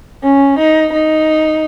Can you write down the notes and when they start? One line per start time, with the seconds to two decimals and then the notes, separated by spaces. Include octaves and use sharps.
0.22 C#4
0.57 D#4
0.92 D#4